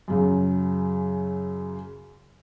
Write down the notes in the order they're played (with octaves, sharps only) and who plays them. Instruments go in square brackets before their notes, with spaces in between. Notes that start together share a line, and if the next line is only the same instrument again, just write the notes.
[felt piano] F#2 C#3 F#3